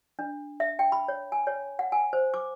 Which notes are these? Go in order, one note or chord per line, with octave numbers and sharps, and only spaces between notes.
D4
E5
G5
B5
C#5
G#5
C#5
F#5
G#5
C5
D6